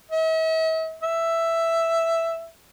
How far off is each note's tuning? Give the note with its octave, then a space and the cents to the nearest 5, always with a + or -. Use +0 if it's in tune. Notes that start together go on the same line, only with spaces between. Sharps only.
E5 -45
E5 +5